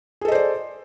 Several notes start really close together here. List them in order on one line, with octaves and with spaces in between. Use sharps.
G#4 A4 D#5 C5 D5